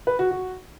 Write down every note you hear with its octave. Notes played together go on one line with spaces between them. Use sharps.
B4
F#4
F#4